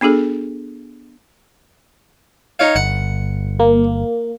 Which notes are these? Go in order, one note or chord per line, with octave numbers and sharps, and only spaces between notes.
B3 D4 F#4 G#4 A4
D#4 C#5 F5
G1 F#5
A#3